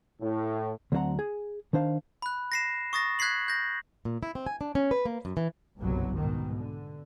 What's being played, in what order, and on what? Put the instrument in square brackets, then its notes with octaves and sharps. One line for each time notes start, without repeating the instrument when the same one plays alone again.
[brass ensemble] A2
[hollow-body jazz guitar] D2 F#3 C4 C5 F#5 A#5
G#4
D#3 D4 C5 F5
[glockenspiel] B5 F#6
A#6 C7 E7
C#6 D#6 A6 A#6
F#6 G#6 B6 C7 F#7
G6 A#6
[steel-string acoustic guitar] A#2
E4
C4
G#5
D4
C#4
B4
A#3
F#2
E3
[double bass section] F#1 C2 G2 B2 F#3
G#2 B2 D#3
D3